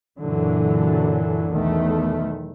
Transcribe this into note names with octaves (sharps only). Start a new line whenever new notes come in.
F#2 A#2 D3 E3 F#3
B1 E2 D#3 A3